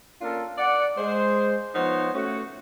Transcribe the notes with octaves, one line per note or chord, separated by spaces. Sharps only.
A#3 C#4 D4 F4 A4 A#4
D5 F#5
G#3 C5
F3 B3 D#4 C5 C#5 F#5
A3 C#4 F#4